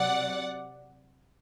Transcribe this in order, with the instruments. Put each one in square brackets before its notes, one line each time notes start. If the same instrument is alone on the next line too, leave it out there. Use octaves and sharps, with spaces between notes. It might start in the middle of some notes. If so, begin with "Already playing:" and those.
Already playing: [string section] C3 F#3 D5 F#5